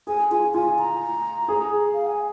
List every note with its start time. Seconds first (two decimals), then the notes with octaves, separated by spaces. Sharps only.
0.07 G#4 G#5
0.31 F4 G#5
0.54 F4 G#5
0.79 A#5
1.48 G#4
1.94 F5
2.06 G#5